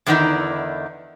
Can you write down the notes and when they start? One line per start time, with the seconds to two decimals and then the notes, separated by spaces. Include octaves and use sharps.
0.06 E2 D3 D#3 B3 D#4 E4